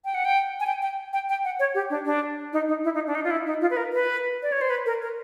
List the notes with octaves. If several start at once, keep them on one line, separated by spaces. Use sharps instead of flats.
G5
F#5
G5
G#5
G5
G5
G5
G5
F#5
C#5
G4
D4
D4
D#4
D#4
E4
D#4
D4
D#4
F4
E4
D#4
F4
B4
A#4
B4
D5
C#5
C5
B4
A#4
A#4